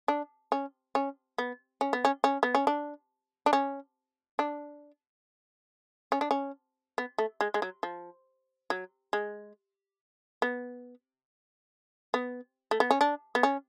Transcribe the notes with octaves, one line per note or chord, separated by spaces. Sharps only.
D4
C#4
C#4
B3
C#4
B3
C#4
C#4
B3
C#4
D4
D4
C#4
D4
C#4
D4
C#4
B3
A3
G#3
G#3
F#3
F3
F#3
G#3
B3
B3
A3
B3
C#4
D4
B3
C#4